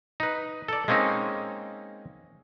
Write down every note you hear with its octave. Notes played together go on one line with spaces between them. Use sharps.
D#4 B4
A4 D5
G#3 A#3 C4 C#4 D#4